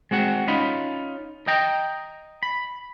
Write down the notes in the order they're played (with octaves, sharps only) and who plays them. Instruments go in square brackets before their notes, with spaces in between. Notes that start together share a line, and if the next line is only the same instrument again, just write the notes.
[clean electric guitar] G#3 C4 F#4 F#5
C#4 D#4 F4 B5
D#5 G5 A#5
B5